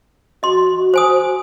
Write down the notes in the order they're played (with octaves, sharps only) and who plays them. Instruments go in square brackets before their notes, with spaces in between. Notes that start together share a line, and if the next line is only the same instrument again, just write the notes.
[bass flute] F#4 [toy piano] D#5 C6
[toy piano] C5 G#5 D#6